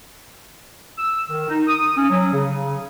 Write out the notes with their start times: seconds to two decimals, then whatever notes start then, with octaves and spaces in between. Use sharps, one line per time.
0.98 E6
1.30 D#3
1.48 D#4
1.67 D#6
1.96 C#4
2.10 F#3
2.33 C#3